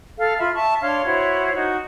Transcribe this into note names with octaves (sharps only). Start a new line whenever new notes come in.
A4 F5
F4 E5 B5
E5 A5 C#6
D4 C#5 F5 C6
E4 F#4 C5 C#5
D#4 F#4